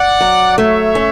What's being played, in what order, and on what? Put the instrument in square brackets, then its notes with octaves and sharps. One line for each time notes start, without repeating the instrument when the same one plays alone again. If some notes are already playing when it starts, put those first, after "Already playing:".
Already playing: [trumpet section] D5 F#5
[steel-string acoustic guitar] F#3
[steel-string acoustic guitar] A3 [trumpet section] C#5 E5
[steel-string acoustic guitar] C#4